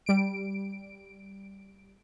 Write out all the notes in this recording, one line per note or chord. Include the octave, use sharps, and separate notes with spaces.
G3 D7